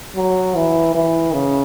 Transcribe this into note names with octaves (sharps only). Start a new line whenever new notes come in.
F#3
E3
E3
C#3